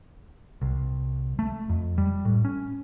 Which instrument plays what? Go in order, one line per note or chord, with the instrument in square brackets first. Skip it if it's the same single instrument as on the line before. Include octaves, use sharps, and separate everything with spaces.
[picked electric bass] C2
A3
F2
G3
A2
C#4